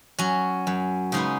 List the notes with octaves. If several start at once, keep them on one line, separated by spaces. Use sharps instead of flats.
F#3 C#4
F#2
C#3 G#3 B3 D#4